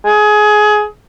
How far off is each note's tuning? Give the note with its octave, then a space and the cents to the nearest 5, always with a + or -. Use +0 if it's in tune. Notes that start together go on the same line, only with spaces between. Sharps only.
G#4 +20